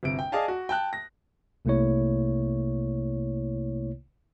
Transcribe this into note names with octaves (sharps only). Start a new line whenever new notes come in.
G1 C3 D7
G5
G#4 D5 D#5 F5 G#5 A5
F#4
G5 A5 F#6
A#6
C2 C3 A3 A#3 E4 C#5